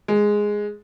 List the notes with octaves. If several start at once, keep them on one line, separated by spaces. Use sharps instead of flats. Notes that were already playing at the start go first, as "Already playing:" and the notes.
G#3